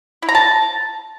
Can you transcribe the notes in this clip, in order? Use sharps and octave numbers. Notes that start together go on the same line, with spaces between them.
E4
A#5
A5